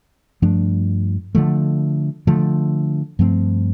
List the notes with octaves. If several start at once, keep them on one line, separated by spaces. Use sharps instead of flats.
G2 F3 A3 D4
D3 F3 A3
D3 F3 A3
G2 F3 A3 C4